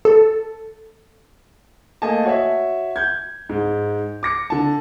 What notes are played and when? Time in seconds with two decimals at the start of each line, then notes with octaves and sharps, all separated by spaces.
0.05 A4
2.02 A3 A#3 D#5 G#5 A5
2.25 F#4 C#5 E5
2.96 G6 G#6
3.49 G#2
4.23 D6 A#6 C#7
4.50 D3 A5